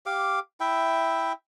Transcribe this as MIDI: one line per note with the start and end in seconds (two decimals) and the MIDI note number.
0.06 0.40 67
0.06 0.40 77
0.06 0.40 86
0.60 1.32 64
0.60 1.32 76
0.60 1.32 79